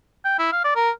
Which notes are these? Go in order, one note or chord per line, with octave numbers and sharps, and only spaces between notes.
G5
E4
F5
D5
A#4